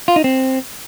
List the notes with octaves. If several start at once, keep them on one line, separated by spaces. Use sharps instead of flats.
F4
D#4
C4